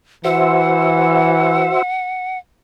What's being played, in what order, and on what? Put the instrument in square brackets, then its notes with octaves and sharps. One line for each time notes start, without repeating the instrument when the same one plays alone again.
[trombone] E3 [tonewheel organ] F#4 C5 E5 [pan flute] F#5